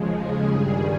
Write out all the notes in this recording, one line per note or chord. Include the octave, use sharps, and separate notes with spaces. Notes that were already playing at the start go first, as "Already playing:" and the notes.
Already playing: D#2 C#3 F3 G#3
G#4
G2 D#3 G3